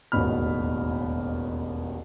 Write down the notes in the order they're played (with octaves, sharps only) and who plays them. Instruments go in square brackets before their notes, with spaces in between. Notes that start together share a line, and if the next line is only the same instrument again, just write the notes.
[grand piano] E1 A1 D#2 B2 B5 F6